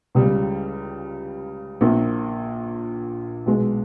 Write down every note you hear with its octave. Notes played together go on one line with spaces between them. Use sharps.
C#2 C#3 G3
A#1 A#2 A#3
B1 B2 G#3